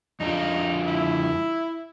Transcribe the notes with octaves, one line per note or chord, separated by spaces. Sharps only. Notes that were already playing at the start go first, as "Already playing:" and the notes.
F2 D4 D#4 F4
E4